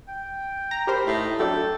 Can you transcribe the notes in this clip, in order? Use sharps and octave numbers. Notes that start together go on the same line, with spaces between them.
G5
A#5
G4 A#4 C5 B5
A2 D#4
F#3 A3 D4 A4 G5